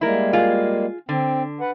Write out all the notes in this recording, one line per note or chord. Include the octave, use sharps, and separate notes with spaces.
G3 G#3 A#3 E4 A#4
F4 G#4
D3 C4
B4 F#5